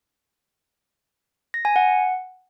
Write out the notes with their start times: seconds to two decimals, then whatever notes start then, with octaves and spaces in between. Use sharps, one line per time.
1.54 A#6
1.65 G#5
1.76 F#5